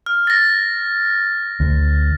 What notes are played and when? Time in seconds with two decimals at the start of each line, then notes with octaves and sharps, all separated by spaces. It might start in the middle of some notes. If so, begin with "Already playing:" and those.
0.06 F6
0.27 A6 A#6
1.60 D2